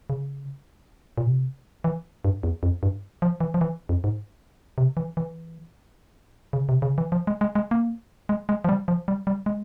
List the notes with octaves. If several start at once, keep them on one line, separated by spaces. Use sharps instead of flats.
C#3
A#2
C3
E3
G2
E2
F2
G2
F3
E3
F3
E3
F2
G#2
C3
E3
E3
C#3
C3
C#3
E3
F3
G#3
G#3
G#3
A#3
G#3
G#3
F3
G3
F3
G3
G3
G#3